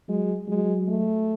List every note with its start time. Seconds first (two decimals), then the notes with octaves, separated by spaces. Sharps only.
0.08 F#3 G#3
0.48 F#3 G#3
0.88 A3